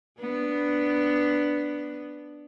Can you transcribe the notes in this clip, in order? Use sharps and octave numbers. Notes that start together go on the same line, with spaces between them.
B3 D4